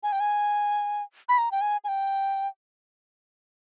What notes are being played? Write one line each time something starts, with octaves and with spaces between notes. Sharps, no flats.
G#5
G5
G#5
B5
A#5
G5
G#5
G#5
G5